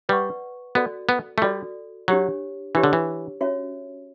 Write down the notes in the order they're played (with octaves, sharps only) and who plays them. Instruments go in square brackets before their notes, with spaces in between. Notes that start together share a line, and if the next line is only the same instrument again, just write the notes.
[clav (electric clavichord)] G3 [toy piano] B4 D5 F#5 C#6
[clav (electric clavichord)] B3 [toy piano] F#4 A4 D5
[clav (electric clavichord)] B3
A3
[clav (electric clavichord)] G3 [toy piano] F#4 A4 D5
[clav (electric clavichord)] F#3 [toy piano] D4 G4 C#5
[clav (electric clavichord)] E3 [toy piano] D4 G4 C#5
[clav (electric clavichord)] D3
E3
[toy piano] C#4 F#4 C#5 E5